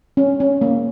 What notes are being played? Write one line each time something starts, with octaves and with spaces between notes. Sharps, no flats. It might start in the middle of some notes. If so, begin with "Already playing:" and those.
C#4
C#4
A#3